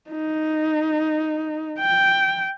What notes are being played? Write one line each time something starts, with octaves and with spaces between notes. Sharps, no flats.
D#4
G5